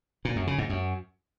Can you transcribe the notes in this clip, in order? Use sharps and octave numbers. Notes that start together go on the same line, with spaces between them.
A#2
F#2
C#3
G#2
F#2